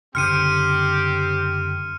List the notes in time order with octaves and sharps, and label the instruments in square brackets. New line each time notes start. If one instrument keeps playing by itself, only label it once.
[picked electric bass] F#1 D3 [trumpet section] C4 G4 [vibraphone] C6 [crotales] F6 C#7 D#7